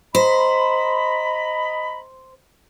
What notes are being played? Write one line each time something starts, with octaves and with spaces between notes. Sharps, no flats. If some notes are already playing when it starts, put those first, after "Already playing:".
C5 D#5 A#5 B5